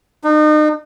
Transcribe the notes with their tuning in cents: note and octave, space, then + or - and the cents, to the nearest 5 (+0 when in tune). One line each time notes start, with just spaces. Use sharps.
D#4 -35